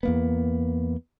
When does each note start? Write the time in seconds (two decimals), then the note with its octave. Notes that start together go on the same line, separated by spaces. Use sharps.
0.03 E2 A#3 B3